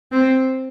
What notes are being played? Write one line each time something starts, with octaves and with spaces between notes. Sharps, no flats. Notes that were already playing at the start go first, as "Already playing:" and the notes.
C4